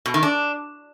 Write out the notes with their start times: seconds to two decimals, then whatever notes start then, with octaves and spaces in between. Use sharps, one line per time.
0.06 B2
0.14 D#3
0.23 D4